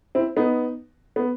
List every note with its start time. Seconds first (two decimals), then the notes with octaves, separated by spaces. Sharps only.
0.15 C4 E4
0.37 B3 D#4
1.16 B3